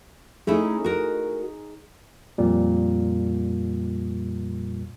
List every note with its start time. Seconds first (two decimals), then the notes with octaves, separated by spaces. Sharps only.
0.47 A3 C#4 D#4 E4 G#4
0.84 F#4 A#4
2.38 F2 A#2 G3